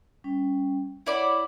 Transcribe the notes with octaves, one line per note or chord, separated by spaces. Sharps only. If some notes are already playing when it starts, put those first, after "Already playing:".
G3 C#4 G5
E4 C#5 D5 F#5 B5